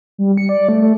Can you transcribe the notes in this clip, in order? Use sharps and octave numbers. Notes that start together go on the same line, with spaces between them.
G3
C#7
D5
A3
A3